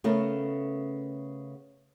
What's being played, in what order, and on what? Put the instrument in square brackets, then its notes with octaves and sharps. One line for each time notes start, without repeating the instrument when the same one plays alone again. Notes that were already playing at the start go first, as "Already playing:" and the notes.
[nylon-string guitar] C#3 A3 B3 A#4